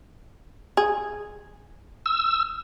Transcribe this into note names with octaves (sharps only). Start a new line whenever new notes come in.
G#4
E6